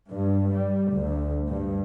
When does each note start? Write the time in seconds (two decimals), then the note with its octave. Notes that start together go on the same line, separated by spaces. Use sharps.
0.11 G2
0.54 G3
0.93 D2
1.50 G2